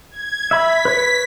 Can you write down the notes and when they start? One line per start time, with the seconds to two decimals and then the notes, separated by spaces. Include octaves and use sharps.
0.11 G#6
0.51 E5 B5 B6
0.85 B4 C#5